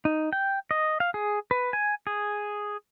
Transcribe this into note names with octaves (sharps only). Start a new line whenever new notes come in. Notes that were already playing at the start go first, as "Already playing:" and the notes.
D#4
G5
D#5
F5
G#4
B4
G#5
G#4